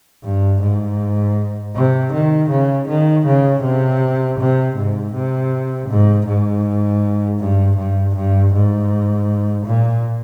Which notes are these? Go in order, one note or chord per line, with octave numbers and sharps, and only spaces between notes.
G2
G#2
C3
D#3
C#3
D#3
C#3
C3
C3
G#2
C3
G#2
G#2
G2
G2
G2
G#2
A#2